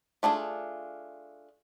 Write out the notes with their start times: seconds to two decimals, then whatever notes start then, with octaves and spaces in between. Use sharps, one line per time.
0.23 A3 D4 F4 G#4